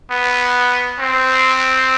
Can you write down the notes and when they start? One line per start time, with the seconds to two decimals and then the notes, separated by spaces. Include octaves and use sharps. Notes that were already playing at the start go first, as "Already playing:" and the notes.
0.11 B3
0.99 C4